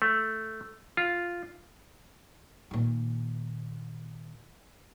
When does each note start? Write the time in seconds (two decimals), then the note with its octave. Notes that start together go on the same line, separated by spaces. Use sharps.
0.02 A3
0.97 F4
2.71 A#2 D#3